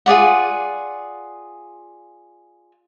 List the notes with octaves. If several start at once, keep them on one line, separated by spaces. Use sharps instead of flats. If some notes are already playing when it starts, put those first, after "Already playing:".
F4 G#4 D5 F#5